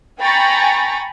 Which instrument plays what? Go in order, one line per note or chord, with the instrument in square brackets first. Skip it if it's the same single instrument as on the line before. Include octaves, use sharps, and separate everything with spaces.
[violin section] G5 G#5 A#5 B5 C#6 A6